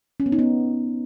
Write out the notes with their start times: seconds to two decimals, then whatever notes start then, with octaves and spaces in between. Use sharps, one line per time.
0.20 C#4
0.26 B3
0.32 D#4
0.39 B3